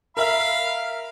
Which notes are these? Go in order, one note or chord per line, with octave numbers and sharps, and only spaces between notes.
A#4 E5 F5 B5